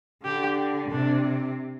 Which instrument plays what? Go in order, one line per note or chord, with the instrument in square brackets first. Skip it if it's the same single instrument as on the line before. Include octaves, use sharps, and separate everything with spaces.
[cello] D3 [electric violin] G4
[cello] C3 [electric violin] D4